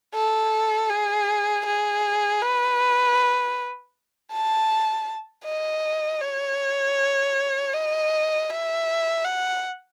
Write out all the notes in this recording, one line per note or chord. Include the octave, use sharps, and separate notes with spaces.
A4
G#4
G#4
B4
A5
D#5
C#5
D#5
E5
F#5